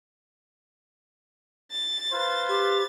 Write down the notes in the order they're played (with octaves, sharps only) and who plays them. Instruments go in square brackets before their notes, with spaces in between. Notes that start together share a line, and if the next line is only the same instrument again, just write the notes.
[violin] A6
[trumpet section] F4 B4 C5
[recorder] G4 [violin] A6